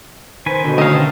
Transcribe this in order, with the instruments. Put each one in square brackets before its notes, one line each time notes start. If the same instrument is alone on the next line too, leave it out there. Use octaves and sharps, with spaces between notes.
[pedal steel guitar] D#3 B4 G#5 [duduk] C5
[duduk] B2 [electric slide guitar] D3
[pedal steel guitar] A3 D#4 F5 [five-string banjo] C#4 D#5
[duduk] D#3 [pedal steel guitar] A5